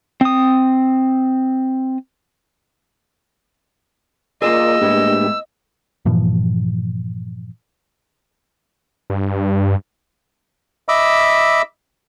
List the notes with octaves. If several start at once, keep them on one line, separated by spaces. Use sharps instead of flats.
C4 D#6
A#3 F4 G#4 A#4 D5 D#5 E6
A2 G#3 A#3 B3 D4 G4
G2 A#2 E3 F3
G2
D#5 E5 B5 D6 E6